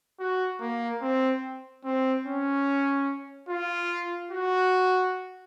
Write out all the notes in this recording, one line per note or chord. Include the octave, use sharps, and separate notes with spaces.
F#4
A#3
C4
C4
C#4
F4
F#4